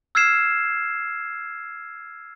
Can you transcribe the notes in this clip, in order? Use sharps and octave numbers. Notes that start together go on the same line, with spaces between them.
E6 F6 G#6 C7 E7